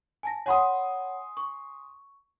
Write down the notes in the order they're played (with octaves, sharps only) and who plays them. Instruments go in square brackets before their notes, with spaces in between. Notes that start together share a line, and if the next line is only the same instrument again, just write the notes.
[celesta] G#5 A5 A#6
[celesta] C#5 F#5 B5 [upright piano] G#5 C6 D#6
[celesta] C#6